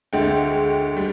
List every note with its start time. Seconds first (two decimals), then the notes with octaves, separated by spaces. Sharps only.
0.13 D2 D3 G#3 G5
0.97 G3